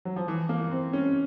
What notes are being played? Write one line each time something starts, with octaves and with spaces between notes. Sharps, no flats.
F#3
F3
E3
A#3
C4
C#4